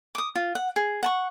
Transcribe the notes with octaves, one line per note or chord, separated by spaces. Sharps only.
D6 D#6
F4
F#5
G#4
F#5 A5 C#6